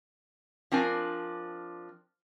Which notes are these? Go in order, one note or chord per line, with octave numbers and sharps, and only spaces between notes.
F3 C4 D4 A#4 G#5